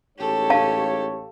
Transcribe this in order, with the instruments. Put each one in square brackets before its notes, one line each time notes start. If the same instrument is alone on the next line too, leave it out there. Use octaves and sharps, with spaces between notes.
[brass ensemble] A1 G#2 C#5 [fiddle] G4 A4
[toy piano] F5 A5